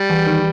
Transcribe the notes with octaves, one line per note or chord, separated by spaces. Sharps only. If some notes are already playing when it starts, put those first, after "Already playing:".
Already playing: G3
E2
D#3